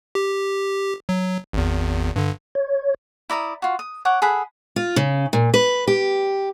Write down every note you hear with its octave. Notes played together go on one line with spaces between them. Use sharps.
G4
F#3
G#1 E2
G2 D3
C#5
E4 D5 A#5 D#6
F4 F#4
D#6
C#5 F#5 D6
G#4 A4 F#5 B5
F4
C#3
A#2
B4
G4